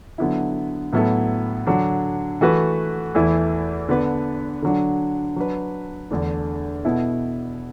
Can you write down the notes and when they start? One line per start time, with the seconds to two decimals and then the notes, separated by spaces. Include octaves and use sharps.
0.18 D3 F#3 B3 E4
0.93 A2 F#3 B3 E4 A4
1.67 D3 F#3 D4
2.41 E3 A3 F#4 B4
3.15 E2 E3 A3 E4
3.89 D3 B3 D4 B4
4.62 D3 F#3 D4
5.36 F#3 D4 B4
6.11 E2 D3 A3 D4
6.85 B2 B3 E4 A4